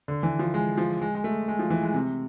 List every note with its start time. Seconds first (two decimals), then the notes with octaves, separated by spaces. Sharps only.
0.08 D3
0.23 E3
0.39 F3
0.54 G#3
0.77 F3
1.01 G#3
1.15 G#3
1.24 A3
1.48 G#3
1.59 F3
1.70 E3
1.83 G#3
1.94 C3